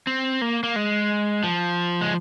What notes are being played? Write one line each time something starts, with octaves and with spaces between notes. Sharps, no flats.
C4
A#3
A#3
G#3
F3
G#3